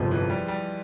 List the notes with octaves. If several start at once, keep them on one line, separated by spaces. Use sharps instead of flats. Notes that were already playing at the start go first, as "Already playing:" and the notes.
Already playing: G1 F2 C3 F3 G#3
E3
G3
G3